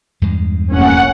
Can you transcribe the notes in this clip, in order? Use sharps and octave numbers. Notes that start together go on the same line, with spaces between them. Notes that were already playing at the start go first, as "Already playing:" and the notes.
E2 G2 G#3
F1 A#3 C#4 F#5